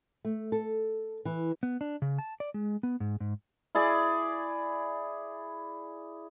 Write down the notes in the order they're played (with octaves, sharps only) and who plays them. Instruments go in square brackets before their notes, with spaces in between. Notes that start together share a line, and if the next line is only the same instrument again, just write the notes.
[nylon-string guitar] A3
A4
E3
[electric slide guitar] B3
D4
C#3
A5
D5
G#3
B3
G#2
G#2
[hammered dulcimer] E4 G#4 D5